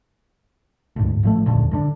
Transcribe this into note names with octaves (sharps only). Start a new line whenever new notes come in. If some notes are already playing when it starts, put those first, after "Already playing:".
D2 G#2
A1 F3 A3
F1 D#2 A#2 D3
G2 D3 D4